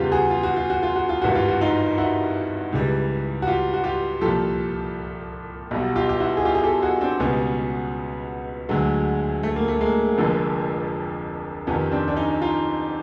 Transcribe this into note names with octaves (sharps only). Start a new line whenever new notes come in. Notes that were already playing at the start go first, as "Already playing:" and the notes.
Already playing: E2 C#3 E3 G3 F4 G4
F#4 G#4
F4
F#4
F4
F#4
F4
F#4
F4
G#1 G2 E3 G3 F#4
F4
F#4
D#4 F4
E4 F#4
C#2 C#3 E3 G3
F#4
F4 G4
F#4
F4 G4
C2 A#2 F3 G4 A4
B1 B2 G3
F4 G4
G4
E4 F#4
G#4
F4 G4
G#4
G4 A4
F#4 G#4
C4 D4
C#2 B2 G3 B3 C#4
D2 D3 F#3 G#3
A3
A#3
A3
G#3 A#3
F1 F2 D3 F3
F2 C3 D#3 B3 C#4
C4 D4
D4
C#4 D#4
D#4 F4